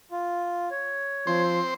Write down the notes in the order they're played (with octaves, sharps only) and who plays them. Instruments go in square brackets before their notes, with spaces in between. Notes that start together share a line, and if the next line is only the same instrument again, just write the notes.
[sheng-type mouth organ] F4
C#5
[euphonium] F3 [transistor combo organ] C4 C5